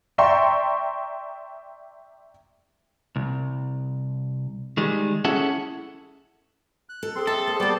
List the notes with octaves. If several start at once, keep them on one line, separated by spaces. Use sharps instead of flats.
D5 E5 G5 A#5 C6 C#6
C2
D#3 G3 G#3
C#4 E4 G#4 A4 E5 F#5
F#6
A4
C4 G#4 C6
A4 E5
A#3
G3 A#3 B3 D5 D6